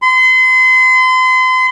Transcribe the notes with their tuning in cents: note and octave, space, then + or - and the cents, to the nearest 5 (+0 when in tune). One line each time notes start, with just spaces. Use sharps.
C6 -35